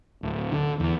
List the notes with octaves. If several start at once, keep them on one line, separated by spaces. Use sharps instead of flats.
D1
D3
E2